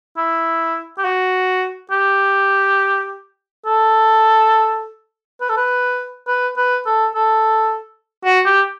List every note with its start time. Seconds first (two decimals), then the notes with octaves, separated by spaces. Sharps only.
0.17 E4
0.98 G4
1.05 F#4
1.91 G4
3.66 A4
5.41 B4
5.49 A4
5.57 B4
6.28 B4
6.57 B4
6.86 A4
7.15 A4
8.25 F#4
8.46 G4